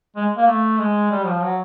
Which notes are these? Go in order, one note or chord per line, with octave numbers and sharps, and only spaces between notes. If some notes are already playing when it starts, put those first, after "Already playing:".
G#3
A#3
A3
G#3
G3
F3
F#3